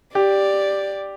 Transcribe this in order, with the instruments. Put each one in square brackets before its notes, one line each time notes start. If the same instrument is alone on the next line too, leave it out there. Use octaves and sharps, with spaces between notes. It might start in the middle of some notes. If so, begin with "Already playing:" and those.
[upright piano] G4 [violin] D5